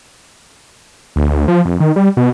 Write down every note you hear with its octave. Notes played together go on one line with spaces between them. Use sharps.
D2
D2
F3
F2
D#3
G3
B2